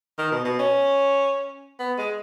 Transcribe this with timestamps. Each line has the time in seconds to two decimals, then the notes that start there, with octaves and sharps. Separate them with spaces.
0.18 D#3
0.32 B2
0.45 B2
0.59 C#4
1.79 B3
1.98 G#3